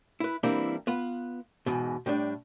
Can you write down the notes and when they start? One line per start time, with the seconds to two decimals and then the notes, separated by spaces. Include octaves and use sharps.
0.20 E4 B4
0.43 E3 G3 A#3 C4 D4 E4
0.87 B3 F4 B4
1.66 E2 G#2 B2
2.06 A2 G3 D4